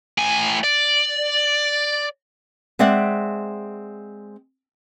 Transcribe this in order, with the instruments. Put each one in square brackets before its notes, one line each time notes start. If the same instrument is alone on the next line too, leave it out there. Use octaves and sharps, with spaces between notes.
[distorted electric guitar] A2 G#5
D5
[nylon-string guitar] G#3 C4 D5 E5 F#5